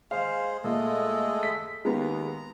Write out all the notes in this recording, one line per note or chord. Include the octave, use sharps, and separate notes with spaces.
G#3 G#4 C5 F5
A#2 G#3 A3 A4 D#5
B6
D#2 G#3 B3 A#5